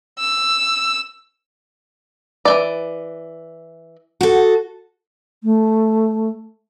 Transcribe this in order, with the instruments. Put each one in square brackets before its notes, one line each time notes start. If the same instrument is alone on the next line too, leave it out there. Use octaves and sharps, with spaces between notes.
[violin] E6
[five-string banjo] E3 A3 D5
[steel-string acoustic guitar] F#4 A4
[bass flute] A3